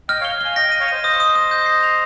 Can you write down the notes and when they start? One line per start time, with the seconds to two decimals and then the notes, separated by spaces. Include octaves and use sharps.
0.09 D#5 G5 F6
0.21 C#5 F5 G7
0.41 F5 G#5 G7
0.56 D#5 G5 A#6
0.68 D#5 G5 D#7
0.80 C#5 F5
0.88 C5 D#5 D#7
1.03 C5 D#5 D#6
1.20 D#6
1.35 D#6
1.51 G6
1.66 C7
1.83 F7